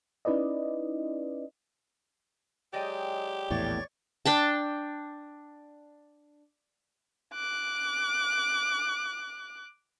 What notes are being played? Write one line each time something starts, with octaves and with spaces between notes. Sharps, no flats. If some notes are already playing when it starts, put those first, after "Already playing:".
C#4 D#4 E4 B4 D5 D#5
F#3 G#3 G4 D5 D#5 G5
A#1 E2 A2 C#5 D5 C#6
D4 G5 A5
D6 F#6